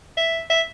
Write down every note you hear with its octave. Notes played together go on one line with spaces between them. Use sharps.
E5
E5